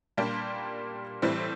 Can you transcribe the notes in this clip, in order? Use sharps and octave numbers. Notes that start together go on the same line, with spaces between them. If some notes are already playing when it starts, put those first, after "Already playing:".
A#2 G3 A#3 D4 G4
A2 E3 G3 C4